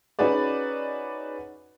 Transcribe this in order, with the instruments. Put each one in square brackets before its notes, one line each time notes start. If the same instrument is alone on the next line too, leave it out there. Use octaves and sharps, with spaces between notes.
[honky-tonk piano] C#4 D#4 F#4 G#4 B4 D5